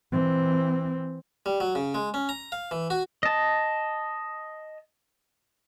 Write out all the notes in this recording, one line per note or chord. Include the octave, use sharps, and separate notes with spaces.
E3 C4
G3
F#3
C#3
G#3
C#4
A#5
F5
E3
F#4
D#5 A5